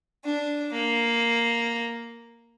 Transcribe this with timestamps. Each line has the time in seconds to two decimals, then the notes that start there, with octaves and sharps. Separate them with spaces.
0.24 D4
0.72 A#3